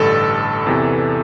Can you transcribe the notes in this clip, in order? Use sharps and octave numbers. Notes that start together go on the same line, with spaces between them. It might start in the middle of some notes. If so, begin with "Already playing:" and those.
Already playing: A1 G2 D3 A4
E2 C3 E3